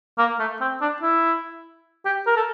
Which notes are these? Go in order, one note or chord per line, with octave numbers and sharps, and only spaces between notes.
A#3
A3
C4
D4
E4
G4
A#4
A4